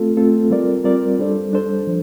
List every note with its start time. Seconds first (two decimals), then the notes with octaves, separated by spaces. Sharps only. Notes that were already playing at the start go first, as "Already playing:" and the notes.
Already playing: A3 C4 F4 A4
0.17 A3 C4 F4 A4
0.51 G3 C4 F4 A#4 D5
0.84 G3 C4 F4 A#4 D5
1.19 G3 D4 A4 C5
1.52 G3 D4 A4 C5
1.87 F3